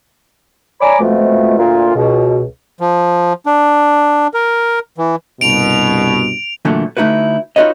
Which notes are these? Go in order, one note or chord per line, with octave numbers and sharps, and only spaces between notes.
C#5 D5 G#5 A#5 B5 D6
F2 B2 F3 G#3 A3
D2 A#2 A#3 F4
C#2 B2
F3
D4
A#4
E3
C2 G2 B2 D7 F7
A#2 D3 E3 F#3 A3
D3 A3 D#4 E4 F#4 B4
D#4 F4 F#4 B4 C#5 D#5